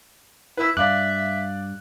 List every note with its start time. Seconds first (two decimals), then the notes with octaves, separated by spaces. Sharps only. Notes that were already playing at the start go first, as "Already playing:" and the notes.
0.57 E4 B4 E6
0.77 G2 D5 E5 F5 D6 F#6